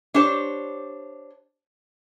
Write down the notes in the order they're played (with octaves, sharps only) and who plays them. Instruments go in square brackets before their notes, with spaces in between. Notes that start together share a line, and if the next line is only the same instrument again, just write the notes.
[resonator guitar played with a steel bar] D4 G4 C5 C#5